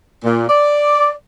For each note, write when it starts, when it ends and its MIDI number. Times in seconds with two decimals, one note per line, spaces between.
0.24 0.47 46
0.49 1.10 74